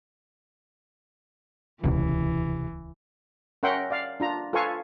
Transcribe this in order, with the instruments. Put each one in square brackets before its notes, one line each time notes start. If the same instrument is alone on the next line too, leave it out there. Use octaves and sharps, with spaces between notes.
[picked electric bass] D#1 C#2 [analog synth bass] C3 [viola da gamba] E3
[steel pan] C#4 A#4 E5 F#5 G5 C6
D5 F5
D4 F4 A#5
F4 A4 B4 F5 G#5 C#6